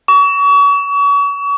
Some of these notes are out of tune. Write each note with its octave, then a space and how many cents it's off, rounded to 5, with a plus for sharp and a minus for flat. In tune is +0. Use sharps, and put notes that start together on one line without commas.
C#6 +35